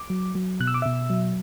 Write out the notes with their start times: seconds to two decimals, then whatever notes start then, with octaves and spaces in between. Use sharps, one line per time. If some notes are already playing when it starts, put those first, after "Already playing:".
Already playing: D6
0.10 F#3
0.35 F#3
0.60 B2 F#6
0.67 E6
0.74 D6
0.82 B2 E5 E6
1.10 F#3